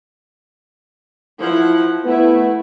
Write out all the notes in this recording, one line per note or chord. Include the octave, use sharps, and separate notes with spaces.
F3 E4 F#5
A3 B3 E4